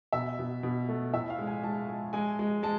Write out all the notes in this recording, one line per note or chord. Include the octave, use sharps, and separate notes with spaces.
B2 E5
B2
B2
A3
A2 E5
F5
G#3
G#5
G#3 A5
G#3
G#3 G#5
G#3
G#3 A5